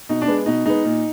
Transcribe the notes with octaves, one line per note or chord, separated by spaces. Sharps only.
B2 D#4
D4
G#3 B3
B2 D#4
G#3 B3 D#4
A#2